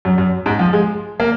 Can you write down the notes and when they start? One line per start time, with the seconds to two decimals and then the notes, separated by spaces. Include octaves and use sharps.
0.05 F#2
0.18 F#2
0.46 G#2
0.59 F3
0.73 G#3
1.20 A#3